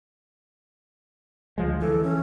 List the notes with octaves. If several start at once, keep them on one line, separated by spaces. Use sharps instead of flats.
D2 F3 G#3
E3 A4
C#4